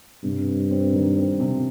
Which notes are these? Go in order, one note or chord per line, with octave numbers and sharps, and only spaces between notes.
G2 C3
C4
C4
D#3
C4
C3